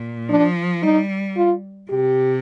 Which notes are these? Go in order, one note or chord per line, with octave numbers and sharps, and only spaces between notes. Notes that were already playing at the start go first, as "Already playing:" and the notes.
Already playing: A#2
F3 D4
G3 D#4
F4
C3 G4